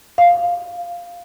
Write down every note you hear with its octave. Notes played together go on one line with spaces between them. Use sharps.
F5